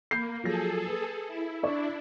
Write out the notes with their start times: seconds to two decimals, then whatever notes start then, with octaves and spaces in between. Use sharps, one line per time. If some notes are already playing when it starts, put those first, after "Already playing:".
0.11 A#3 B5 G6 C7
0.44 F3 F#3 G#4 A4 A#6
0.87 B4
1.28 E4
1.63 D4 E4 D5 C#6